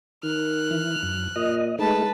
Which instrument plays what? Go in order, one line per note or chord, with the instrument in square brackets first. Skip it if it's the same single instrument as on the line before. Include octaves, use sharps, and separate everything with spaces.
[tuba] D#3 [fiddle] F6 F#6
[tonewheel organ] E3
F#2
[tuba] A#2 [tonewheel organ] D#5
[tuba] G#3 [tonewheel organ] A3 D#4 [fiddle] B4 A5